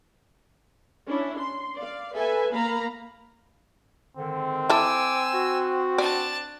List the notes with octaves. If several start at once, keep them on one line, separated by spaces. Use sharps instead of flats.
C#4 D4 E4
C6
D5 F5
A4 B4 E5 G#5
A#3 F5 A#5 B5
G#2 D3 D#3 C4
E4 A4 G#5 D6 E6
F#4
D4 D5 A5